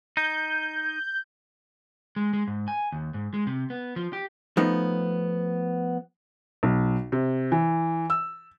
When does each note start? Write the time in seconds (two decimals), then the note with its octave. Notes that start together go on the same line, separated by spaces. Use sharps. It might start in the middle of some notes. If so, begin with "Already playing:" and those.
0.17 D#4 G6
2.16 G#3
2.33 G#3
2.48 G#2
2.68 G#5
2.92 D#2
3.14 G#2
3.34 G#3
3.47 C3
3.70 B3
3.96 F3
4.13 G4
4.57 F3 A3 B3 D#4
6.63 B1
7.12 C3
7.52 E3
8.10 E6